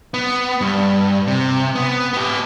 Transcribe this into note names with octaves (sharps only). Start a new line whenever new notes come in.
B3
G2
C3
B3
B3 G4